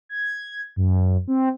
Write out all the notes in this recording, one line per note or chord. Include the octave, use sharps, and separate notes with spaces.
G#6
F#2
C4